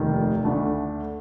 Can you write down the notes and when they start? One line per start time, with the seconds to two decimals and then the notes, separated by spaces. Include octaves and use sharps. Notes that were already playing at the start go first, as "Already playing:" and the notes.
Already playing: F1 D#2 D#3
0.44 D2 D3 A3 D4